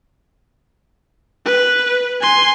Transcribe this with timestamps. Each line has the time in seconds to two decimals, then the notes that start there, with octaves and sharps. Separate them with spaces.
1.45 B4
2.21 G#5 C6